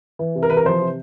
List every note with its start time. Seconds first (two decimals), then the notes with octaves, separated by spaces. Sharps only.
0.19 E3
0.35 C3
0.43 A#4
0.50 E3 B4
0.57 A#4
0.65 F3 C5
0.81 C3